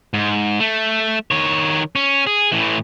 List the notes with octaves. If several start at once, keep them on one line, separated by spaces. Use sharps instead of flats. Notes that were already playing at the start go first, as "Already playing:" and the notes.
G#2
A3
D#3 C#5
C#4
G#4
A2 E3